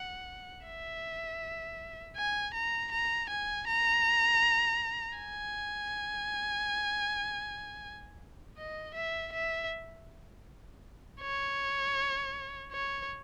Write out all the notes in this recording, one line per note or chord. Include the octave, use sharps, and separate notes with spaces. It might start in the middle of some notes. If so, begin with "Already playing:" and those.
Already playing: F#5
E5
G#5
A#5
A#5
G#5
A#5
G#5
D#5
E5
E5
C#5
C#5